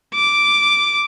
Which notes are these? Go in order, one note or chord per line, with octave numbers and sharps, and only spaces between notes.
D6